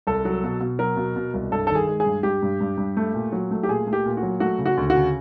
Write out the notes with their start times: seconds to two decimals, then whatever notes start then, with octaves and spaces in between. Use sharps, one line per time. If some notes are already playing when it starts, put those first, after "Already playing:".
0.07 C2 A4
0.25 F#3
0.43 B2
0.60 B2
0.79 F#3 A#4
0.97 B2
1.16 B2
1.34 C2
1.52 G2 A4
1.67 D#3 A4
1.75 G#4
1.87 G#3
2.00 G#4
2.06 G2
2.23 G2 G4
2.43 G2
2.61 G2
2.78 G2
2.97 A3
3.14 A#2
3.32 F#3
3.51 A3
3.63 G4
3.68 A#2 G#4
3.87 A3
3.93 G4
4.05 A#2
4.17 F#4
4.23 F#3
4.40 A3 F#4
4.58 C#3
4.66 F#4
4.77 D2
4.90 F#4
4.96 C#3